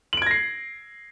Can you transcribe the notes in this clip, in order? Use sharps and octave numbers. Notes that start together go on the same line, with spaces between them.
G#6 A#6 C7 D7 F#7